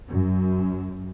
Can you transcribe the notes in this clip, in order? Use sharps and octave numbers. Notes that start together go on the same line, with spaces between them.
F#2